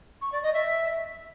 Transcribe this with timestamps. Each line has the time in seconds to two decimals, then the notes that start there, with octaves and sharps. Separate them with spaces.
0.21 C#6
0.32 D5
0.43 D#5
0.53 E5